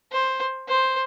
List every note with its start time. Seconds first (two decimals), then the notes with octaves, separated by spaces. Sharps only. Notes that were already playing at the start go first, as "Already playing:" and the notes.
0.12 C5
0.68 C5